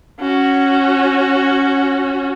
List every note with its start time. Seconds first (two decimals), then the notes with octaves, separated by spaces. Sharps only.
0.20 C#4 F#4